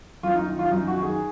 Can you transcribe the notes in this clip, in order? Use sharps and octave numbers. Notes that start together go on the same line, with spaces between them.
F#2 F4
D#4
D#3
F4
F#2 D#4
F#4
D#3
G#4